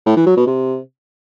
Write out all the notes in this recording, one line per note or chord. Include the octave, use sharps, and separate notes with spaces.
A2
E3
F#3
B2
C3